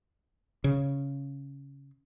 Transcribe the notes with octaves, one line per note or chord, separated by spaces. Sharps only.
C#3